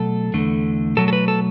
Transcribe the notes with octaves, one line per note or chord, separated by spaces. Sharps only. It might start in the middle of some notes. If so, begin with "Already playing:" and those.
Already playing: B2 F#3 A3 A4
E2 D3 A3
B2 F#3 A3 A4
A4
B4
A4